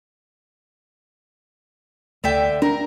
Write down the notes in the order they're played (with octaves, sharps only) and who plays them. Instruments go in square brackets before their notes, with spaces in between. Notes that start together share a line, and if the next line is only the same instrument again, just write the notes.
[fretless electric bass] D2 [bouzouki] D3 E5 G5
[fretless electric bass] D4 [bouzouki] A#4